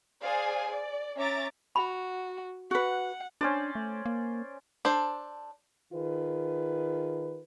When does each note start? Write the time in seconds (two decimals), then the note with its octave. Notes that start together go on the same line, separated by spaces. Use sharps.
0.23 G#4 C5 D5 F5 G#5
0.70 D5
1.18 C#4 E5 A#5 D6 A6
1.76 F#4 B5
2.71 F#4 B4 F#5
3.41 C#4 D4 C5 D5
3.75 A3
4.06 A#3
4.85 D4 A4 C5
5.93 D#3 F4 G#4 B4